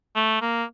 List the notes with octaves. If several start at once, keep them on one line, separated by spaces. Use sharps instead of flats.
A3
A#3